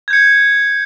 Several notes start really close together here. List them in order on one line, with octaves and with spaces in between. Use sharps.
G#6 G6 C#7